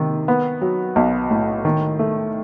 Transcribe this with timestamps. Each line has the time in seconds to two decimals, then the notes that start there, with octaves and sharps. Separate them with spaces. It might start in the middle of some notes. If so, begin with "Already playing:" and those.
Already playing: C3 D#3
0.28 B3
0.62 F#3
0.96 B1
1.31 A2
1.65 D#3
1.99 A3